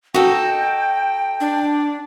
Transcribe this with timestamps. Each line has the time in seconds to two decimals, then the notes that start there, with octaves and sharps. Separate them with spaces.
0.14 D#4 F#4 A4 G5
1.40 D4